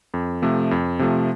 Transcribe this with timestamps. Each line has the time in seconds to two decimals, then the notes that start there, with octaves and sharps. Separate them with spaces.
0.14 F2
0.42 C3 F3 A3
0.71 F2
0.99 C3 F3 A3